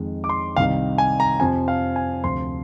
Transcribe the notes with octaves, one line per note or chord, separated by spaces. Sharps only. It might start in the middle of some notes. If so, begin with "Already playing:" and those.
Already playing: F2 D#3 G#3
D6
C6
C2 C3 D#3 F5
G#5
A#5
F2 C3 F3 G#5
F5
G#5
D2 C3 F3 C4 C6